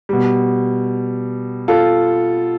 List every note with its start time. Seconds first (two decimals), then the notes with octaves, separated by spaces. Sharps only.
0.09 B2 G3
1.68 F4 A4